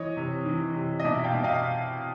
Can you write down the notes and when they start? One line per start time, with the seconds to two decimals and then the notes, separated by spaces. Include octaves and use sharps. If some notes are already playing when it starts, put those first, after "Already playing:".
Already playing: E3 C#5 D#5
0.17 C3
0.45 E3
0.75 C3
1.00 D#5
1.04 B2 D5 E5
1.24 F5 G5
1.34 B2
1.43 D#5 F5